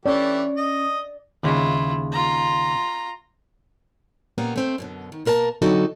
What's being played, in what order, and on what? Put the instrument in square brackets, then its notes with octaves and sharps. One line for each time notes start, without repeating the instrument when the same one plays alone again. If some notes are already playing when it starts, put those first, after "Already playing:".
[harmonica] E3 A3 G4 [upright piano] C#4 C#5 [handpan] D5
[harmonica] D#5
[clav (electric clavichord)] D#2 C#3 G#3 [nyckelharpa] E4 F4
[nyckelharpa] F4 A#5
[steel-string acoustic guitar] A#2 A#3 B3 C#4 G4
A3 C4 C5
F#2 B2 D3
D#3
B2 A#3 A#4 B4 A5
D3 F#3 C4 D#4 F#4 A4